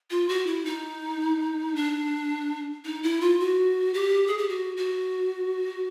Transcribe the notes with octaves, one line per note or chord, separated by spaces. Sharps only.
F4
F#4
E4
D#4
D4
D#4
E4
F4
F#4
G4
G#4
G4
F#4
F#4